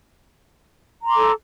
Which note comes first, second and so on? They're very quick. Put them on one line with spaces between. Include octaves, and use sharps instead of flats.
A#5 C6 D6 A4